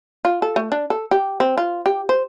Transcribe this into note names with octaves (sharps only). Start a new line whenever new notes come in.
F4
A4
A3
D4
A4
G4
C4
F4
G4
C5